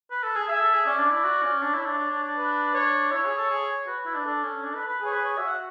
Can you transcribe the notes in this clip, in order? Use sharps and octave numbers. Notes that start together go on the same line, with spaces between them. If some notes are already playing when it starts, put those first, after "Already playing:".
B4
A4
G#4
G#4 E5
A4
G#4
C#4 D5
D4
E4
F#4
C#4
D4 C#5
E4
D4
D4
D4
D4
B4
C#5
E4 C#5
G#4
A4
G#4
F#4 B4
E4
D4
D4 A4
C#4
D4
B4
B4
G#4 C#5
B4
C#5
F#4 E5
F#5